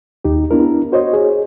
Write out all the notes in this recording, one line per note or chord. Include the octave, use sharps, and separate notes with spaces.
D#2 D#4 G4
B3 D4 E4 A#4
F#4 C5 C#5 D#5
G#4